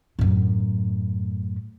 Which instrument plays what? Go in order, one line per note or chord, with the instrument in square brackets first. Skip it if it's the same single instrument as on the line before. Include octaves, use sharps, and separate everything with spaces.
[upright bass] F#2 A2